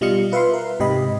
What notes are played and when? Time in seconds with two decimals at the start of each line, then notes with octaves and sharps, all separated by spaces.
0.01 B2 G3 F4 D#5 F5 C#7
0.32 F4 B4 E5 F5 B5 C6
0.53 A#4
0.80 G#2 C3 G4 D#5 B5